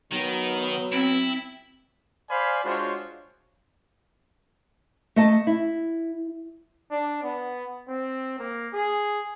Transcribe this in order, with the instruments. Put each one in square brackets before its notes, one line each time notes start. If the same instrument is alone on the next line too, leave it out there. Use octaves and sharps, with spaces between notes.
[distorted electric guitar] D#3 [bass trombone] F#3 [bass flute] B3
[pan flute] C4 [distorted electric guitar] E4
[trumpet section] C5 D5 F5 G#5 B5
G#3 D4 F4 F#4 C5 C#5
[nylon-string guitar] A3 D#5 A5
E4
[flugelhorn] D4
B3
C4
A#3
G#4